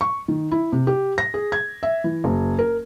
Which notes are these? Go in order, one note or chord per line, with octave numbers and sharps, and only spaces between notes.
C#6
D#3
E4
C3
G4
A#6
G#4
G#6
E5
E3
F#1
A#4